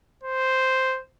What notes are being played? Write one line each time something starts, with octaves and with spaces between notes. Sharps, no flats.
C5